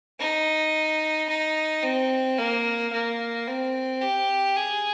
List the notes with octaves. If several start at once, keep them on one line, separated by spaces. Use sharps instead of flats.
D#4
D#4
C4
A#3
A#3
C4
G4
G#4